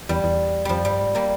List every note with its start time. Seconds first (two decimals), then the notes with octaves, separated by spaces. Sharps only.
0.09 E2 G3
0.24 E2
0.65 F2 F3 G3
0.84 G2 G3
1.01 G#2
1.15 G3 A#3